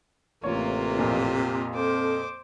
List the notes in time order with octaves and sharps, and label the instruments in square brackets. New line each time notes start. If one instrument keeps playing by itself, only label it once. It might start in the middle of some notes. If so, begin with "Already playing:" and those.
[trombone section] A1 [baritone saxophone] C3 [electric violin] A#3 F4 [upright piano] C#5
[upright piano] F2 A#2
[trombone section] C4 A4 [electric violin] C5 D6